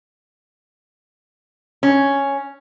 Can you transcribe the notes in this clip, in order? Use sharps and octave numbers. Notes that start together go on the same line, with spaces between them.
C#4